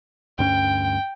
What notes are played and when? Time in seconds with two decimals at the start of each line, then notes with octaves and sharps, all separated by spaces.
0.39 D2 G2 C#4 G5